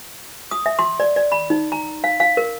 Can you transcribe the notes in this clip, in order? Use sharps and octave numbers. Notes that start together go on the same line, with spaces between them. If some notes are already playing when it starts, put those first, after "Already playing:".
D#6
E5
C6
D5
D5
B5
D#4
A#5
F5
F5
A#4